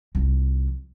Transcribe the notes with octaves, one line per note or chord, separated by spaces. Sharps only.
C2 F3